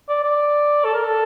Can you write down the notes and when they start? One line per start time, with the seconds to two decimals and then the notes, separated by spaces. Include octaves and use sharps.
0.09 D5
0.24 D5
0.85 A4
0.94 A#4
1.04 A4